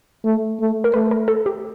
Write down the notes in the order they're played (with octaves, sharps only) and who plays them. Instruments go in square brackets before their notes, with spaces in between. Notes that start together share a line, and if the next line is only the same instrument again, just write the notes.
[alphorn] A3
A3
[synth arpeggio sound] A#4
[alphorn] A3 [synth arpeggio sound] B4
[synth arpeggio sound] A#4
A4
G4